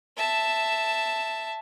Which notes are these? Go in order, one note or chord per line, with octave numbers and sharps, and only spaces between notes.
E5 A5